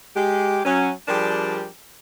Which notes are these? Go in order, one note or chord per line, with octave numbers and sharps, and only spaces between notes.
G#3 G4
F#3 C#4
F3 G3 D4 G4 G#4 A#4